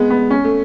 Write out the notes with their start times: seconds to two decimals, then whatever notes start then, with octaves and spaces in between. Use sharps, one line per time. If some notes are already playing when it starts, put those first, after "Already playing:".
Already playing: G#3 B3
0.10 B3
0.30 C#4
0.44 A3